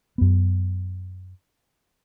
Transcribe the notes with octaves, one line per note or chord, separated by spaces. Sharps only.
F#2 B3